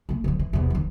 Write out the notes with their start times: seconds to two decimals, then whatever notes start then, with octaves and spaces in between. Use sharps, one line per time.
0.09 A3 A#3
0.24 D3 F3
0.39 E3
0.53 E2 C3
0.70 D#3 F3